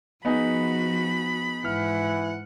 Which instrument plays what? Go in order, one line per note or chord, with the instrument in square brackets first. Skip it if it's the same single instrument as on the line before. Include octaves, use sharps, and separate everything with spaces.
[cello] F3 F#4 [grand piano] B3 D#4 G#4 [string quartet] B5
[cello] G#2 F#5 [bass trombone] E3 [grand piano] F6